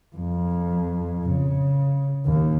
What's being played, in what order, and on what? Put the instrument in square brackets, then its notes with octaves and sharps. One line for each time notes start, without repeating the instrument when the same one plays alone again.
[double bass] F2
C#3
D#2